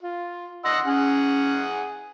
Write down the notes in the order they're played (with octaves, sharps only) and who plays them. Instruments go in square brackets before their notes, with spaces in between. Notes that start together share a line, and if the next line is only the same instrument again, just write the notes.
[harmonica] F4
[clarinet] D#5 [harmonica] F#5 C6 E6
[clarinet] C#4 [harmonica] G#4 F#5